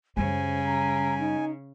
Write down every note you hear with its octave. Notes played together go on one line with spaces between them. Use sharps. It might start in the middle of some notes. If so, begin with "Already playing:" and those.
F#2 C#3 G3 C5 G#5
A#5
D#4